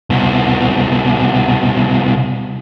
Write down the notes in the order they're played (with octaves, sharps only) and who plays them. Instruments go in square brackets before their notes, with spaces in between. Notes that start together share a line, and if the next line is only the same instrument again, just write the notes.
[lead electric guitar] C2 B2